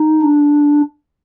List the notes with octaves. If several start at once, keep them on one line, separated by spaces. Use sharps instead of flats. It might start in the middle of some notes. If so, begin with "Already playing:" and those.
Already playing: D#4
D4